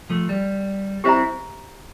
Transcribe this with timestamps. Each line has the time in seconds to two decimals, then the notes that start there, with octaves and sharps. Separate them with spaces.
0.10 F3 A3
0.29 G3
1.04 C4 E4 G4 C5 E5 A#5